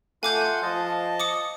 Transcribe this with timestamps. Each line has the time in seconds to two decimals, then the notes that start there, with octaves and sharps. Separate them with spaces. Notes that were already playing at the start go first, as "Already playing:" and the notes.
0.23 A3 F4 F#5 G#5 C6 D6 G6
0.63 F3 D#5 A5
1.20 D6 D#6 C#7